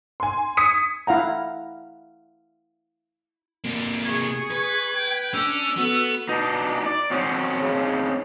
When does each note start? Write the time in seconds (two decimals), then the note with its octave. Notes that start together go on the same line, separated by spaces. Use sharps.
0.20 G#5 C6
0.57 D#6 G#6 B6 C#7 D#7
1.07 E4 F5 F#5 A#5
3.65 C3 A#3
4.04 G#4 C#6 G#6
4.50 B4
4.96 G5
5.33 C#4 D4 E6
5.77 B3 F#4 A4
6.29 B2 D4 D#4
6.86 D5
7.11 F#3 C4 C#4 D#4
7.62 C#3